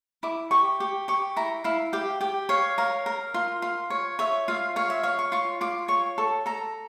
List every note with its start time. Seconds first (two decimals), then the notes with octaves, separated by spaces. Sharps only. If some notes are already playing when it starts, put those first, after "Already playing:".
0.23 E4 D6
0.51 G4 C#6
0.80 G4
1.08 G4 C#6
1.36 E4 A#5
1.64 E4 F5
1.93 G4 G5
2.21 G4 G5
2.49 C#5 F5
2.78 A#4 F5
3.06 A#4
3.34 F4
3.62 F4
3.90 C#5
4.19 C#5 E5
4.48 F4 F5
4.76 C#5 F5
4.90 E5
5.03 C#5 F5
5.19 C#6
5.32 F4 C#6
5.61 F4 D6
5.88 C#5 C#6
6.18 A4 C#6
6.46 A4 A#5